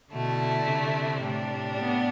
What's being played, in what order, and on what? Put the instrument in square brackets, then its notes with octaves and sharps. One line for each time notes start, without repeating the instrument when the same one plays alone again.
[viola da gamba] B2 [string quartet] D3 A3 E4
[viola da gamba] C3
[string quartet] A2 G3 D4
[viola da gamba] B3